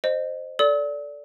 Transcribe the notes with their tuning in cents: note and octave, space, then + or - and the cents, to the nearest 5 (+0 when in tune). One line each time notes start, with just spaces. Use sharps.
C5 +0 D#5 -25
A4 +0 D5 -15 E6 -45